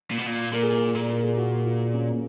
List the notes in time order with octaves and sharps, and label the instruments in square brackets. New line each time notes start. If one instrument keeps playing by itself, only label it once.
[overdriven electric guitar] A#2
B2
A#2
[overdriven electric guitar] A#2 [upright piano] A#4
[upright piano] G#4
A#4
[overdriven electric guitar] A#2 [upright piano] G#4
[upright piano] A#4
G#4
F#4
F4
C#4
A#3